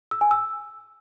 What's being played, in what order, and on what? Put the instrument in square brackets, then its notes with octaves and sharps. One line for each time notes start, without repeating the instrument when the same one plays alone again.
[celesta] E6
G#5
E6